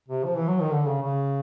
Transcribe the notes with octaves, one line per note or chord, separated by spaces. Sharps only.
C3
F3
E3
F#3
D#3
D3
C#3
C#3